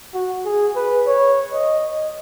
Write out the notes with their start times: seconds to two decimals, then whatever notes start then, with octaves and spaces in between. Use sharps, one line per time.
0.14 F#4
0.45 G#4
0.76 B4
1.07 C#5
1.54 D#5